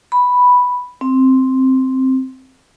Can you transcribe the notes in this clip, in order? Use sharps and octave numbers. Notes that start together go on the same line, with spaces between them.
B5
C4